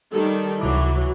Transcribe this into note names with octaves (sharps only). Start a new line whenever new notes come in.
D#3 G3 A4
C#2 C3 E3 F#3 D6